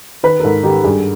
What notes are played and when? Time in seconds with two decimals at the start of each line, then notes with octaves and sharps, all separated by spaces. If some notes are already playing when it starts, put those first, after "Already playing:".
0.23 D#3 B4
0.40 A#4
0.43 G#2 A4
0.63 D#3 G4
0.84 G2 G#4